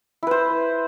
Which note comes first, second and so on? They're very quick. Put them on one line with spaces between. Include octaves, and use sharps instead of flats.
E4 B4 C5